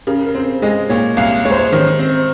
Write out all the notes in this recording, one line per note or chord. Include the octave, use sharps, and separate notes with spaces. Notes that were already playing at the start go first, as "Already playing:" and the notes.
C#3 A#4
A#4
C4 C5
G#3 D#5
A#2 C#5
C2 F5
G#3 C#5
C5
C#5
D#3 C5
C4